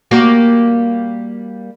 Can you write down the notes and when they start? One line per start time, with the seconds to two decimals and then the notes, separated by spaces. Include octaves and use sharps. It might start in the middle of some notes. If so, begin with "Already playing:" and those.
0.11 G3 A#3 F#4